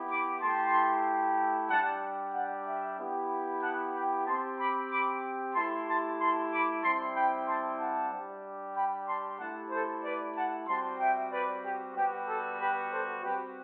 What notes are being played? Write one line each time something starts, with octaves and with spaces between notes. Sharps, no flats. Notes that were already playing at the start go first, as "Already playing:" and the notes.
Already playing: B3 E4 G4
B5 D6
A3 E4 G4 A5 C6
G3 D4 G4 F#5 A5
D5 F#5
E5 G5
B3 E4 G4
F#5 A5
G5 B5
C4 G4 A5 C6
B5 D6
B5 D6
A3 E4 G4 A5 C6
A5 C6
A5 C6
B5 D6
G3 C4 E4 A5 C6
G5 B5
A5 C6
F#5 A5
G3 D4 G4
G5 B5
A5 C6
A3 E4 G4 F#5 A5
A4 C5
B4 D5
F#5 A5
G3 C4 F#4 A5 C6
E5 G5
B4 D5
G4
G3 B3 F#4 G4
A4
G4 B4
A4 C5
G3 C4 F#4 G4 B4